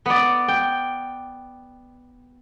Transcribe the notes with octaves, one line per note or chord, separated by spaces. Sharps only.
B3 D5
G5